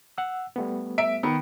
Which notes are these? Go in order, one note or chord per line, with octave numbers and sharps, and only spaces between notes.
F#5 E6
G3 A3 B3
E5 D7
D#3 B3